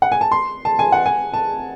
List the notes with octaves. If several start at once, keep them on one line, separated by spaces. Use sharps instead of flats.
F#5
G#5
A5
C6
A5
G#5
F#5
G#5
A5